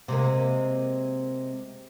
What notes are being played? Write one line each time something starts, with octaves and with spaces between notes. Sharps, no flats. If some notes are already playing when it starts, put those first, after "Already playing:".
C3 G#3 A#3